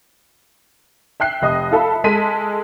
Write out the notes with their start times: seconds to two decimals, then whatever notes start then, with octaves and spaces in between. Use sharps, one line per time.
1.20 E5 G5 F#6 C7
1.42 F1 D#5 D#6
1.71 F4 A4 E5 B5
2.04 G#3 A4 B6 D#7